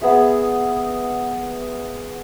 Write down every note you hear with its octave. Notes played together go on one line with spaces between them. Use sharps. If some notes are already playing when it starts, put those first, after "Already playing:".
B3 G#4 E5